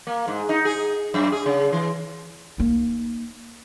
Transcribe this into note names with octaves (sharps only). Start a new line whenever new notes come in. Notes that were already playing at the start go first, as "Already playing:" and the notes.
A#3
G#2
D#4
G#4
F#2
G#4
C#3
E3
A#3 D#4